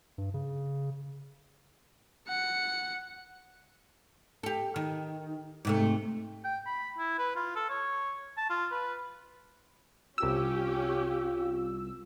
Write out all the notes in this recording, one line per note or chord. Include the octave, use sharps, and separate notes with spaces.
G2
C#3
F#5 C#7
G4 A4
D#3
G#2 C3 A3
G5
B5
E4
B4
F4
A4
C#5
A5
F4
B4
C2 C#4 F4 G4 E6